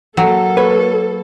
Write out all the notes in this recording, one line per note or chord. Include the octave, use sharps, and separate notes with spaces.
F#3 A#3 A4
B4 C#5